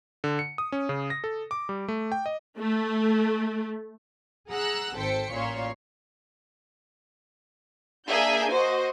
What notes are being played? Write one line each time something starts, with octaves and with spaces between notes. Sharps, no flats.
D3
C#7
D#6
C#4
C#3
A#6
A4
D6
G3
A3
G5
D#5
A3
G#4 F#5 A#5 E6 F#6
G#1 A4 C5 G5 B6 C#7
A1 A#2 C#5 C6
A#3 D4 G#4 E5 G#5 G6
F#4 C5 D#5